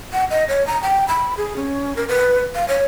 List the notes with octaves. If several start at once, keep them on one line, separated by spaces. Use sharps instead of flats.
F#5
D#5
C#5
A#5
G5
B5
G#4
C#4
A#4
B4
F5
C#5